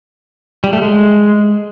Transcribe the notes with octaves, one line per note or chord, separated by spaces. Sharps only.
G3
A3
G#3